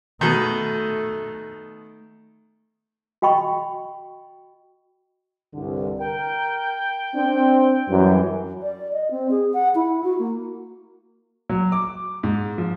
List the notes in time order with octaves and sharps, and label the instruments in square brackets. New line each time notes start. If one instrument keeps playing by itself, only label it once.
[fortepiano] B2 D#3 [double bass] A3
[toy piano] F#4 D#5 G5 B5 C#6
[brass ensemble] C2 G2 D3
[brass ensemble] A#4 [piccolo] G5
[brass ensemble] C4 [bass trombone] D4
[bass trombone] F#2 [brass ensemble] E3 F#3 G3
[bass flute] D5
D#5
C4
G#4
F#5
E4
F#4
A#3
[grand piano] F#3
D6
G#2
F3